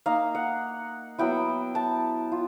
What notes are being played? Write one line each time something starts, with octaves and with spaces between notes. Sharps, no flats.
A#3 D#4 F5
F#5
F#3 B3 E4 G5
A5
F4